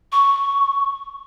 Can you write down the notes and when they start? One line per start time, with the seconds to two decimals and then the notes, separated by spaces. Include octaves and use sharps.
0.12 C#6